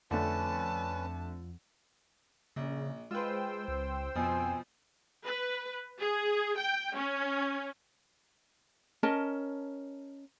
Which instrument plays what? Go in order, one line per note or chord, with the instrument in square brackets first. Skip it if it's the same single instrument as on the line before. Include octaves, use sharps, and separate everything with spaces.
[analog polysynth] F2 [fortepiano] D3 A3 [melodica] C#4 B4 [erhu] A5
[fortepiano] A#1 [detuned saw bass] C#3
[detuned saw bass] G#3 [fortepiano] F4 B4 [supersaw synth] C5 G5 E6
[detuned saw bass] C#2
[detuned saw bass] F2 [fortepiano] B2 F3 [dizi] G#5
[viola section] B4
G#4
G5
C#4
[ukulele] C#4 A#4 D#5 A5